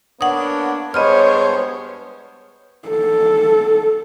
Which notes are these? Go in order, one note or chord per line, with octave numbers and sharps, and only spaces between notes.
A#3 B3 D4 C#5 F#5 D#6
G2 G#3 B3 C5 C#5 D#5 B5 F6
A4